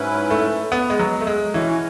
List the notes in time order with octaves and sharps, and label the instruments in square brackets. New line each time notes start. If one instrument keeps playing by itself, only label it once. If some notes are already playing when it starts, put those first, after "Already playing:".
Already playing: [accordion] G#2 F#3 C#4 E4 B4
[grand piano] A3
B3
G#3
F#3
A3
G#3
[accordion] B2 G#3 C#4 F#4 C#5 [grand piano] E3